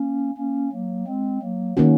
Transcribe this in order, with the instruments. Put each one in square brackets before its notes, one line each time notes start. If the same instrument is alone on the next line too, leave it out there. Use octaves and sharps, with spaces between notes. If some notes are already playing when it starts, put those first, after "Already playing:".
Already playing: [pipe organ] A#3 C#4
A#3 C#4
F#3 A#3
G#3 C4
F#3 A#3
[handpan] D#3 A#3 C#4 F#4